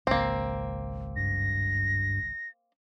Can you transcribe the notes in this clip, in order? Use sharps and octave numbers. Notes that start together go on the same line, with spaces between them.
G#1 C#2 A#3 C4
G2 A#6